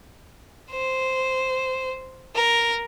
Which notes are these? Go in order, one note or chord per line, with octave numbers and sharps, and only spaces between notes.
C5
A#4